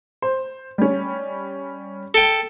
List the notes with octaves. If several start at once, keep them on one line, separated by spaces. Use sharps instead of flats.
C5
G3 C#4
A4 G5